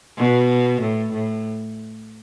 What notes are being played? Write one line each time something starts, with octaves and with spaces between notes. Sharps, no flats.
B2
A2
A2